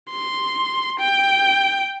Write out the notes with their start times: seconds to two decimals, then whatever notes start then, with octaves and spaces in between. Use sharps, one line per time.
0.10 C6
1.00 G5